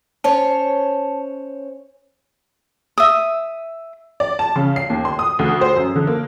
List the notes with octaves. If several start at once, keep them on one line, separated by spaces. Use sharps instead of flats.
C#4 C5 C#5 A5
E5 D#6
D5
A5
C#3
C7
D#2
C6
D#6
D2
C5
F#2
D3
A#3